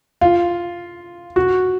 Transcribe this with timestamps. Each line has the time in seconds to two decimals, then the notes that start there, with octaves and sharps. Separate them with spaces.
0.21 F4
1.36 F#4